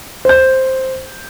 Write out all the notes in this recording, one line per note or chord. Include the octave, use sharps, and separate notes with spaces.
C5 G6